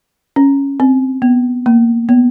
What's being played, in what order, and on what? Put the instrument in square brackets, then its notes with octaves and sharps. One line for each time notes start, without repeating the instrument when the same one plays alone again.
[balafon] C#4
C4
B3
A#3
B3